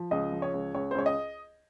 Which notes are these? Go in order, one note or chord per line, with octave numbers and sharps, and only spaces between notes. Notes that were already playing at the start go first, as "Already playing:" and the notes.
Already playing: F3
C#2 D#5
F3
C#5
C#2
C#2 C#5
C5
C#2 C#5
D#5